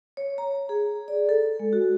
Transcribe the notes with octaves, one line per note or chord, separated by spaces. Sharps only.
C#5
A#5
G#4
D5
A4
G#3
F#4